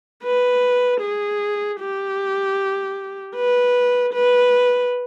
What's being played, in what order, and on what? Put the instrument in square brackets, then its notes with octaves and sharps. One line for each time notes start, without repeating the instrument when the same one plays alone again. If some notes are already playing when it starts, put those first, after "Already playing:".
[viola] B4
G#4
G4
B4
B4